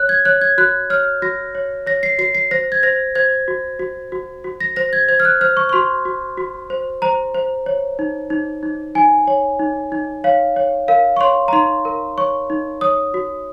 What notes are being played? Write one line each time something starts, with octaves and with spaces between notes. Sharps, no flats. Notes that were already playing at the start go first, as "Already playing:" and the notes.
Already playing: C#5 F#6
G#6
C#5 F#6
G#6
F#4 F#6
C#5 F6
F#4 A#6
C#5
C#5 A#6
C7
F#4 C7
C7
C5 A#6
G#6
C5 A#6
C5 G#6
F#4
F#4
F#4
F#4
A#6
C5 A#6
G#6
C5 G#6
F6
F#6
C5 F6
C#6
C#6
F#4 C6
F#4
F#4
C5
C5 A#5
C5
C#5
D#4
D#4
D#4
D#4 G#5
C#5
D#4
D#4
C#5 F5
C#5
A#4 F5
C#6
C#5 C6
A#5
D#4 C6
A#4
C#5 C#6
D#4
C#5 D#6
F#4